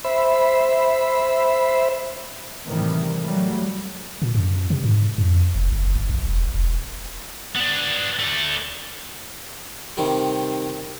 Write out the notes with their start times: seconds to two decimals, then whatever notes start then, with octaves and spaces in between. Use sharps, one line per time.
0.04 C5 E5 B5
2.66 A2 C3 D#3 E3 G3
3.22 F#3 G3 A3
4.22 A#2
4.35 F#2
4.70 C3
4.84 G#2
5.18 F2
5.55 F1
5.72 F#1
5.95 G1
6.09 A#1
6.28 E1
6.54 E1
7.56 B3 D4
8.19 A3 D5
9.97 C3 D#3 G3